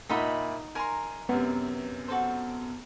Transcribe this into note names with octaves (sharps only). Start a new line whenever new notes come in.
A#2 D#4 D#5 E5 F#5 B5
A#4 G#5 A#5 C6
F#2 C3 B3
F#4 A4 C5